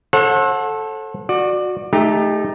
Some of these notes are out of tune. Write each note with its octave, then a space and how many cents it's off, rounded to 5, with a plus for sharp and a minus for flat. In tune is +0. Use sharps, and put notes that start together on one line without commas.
A4 -5 C5 +45 F#5 -25
F#4 -15 D5 +20
A3 -15 D#4 +0 G4 +30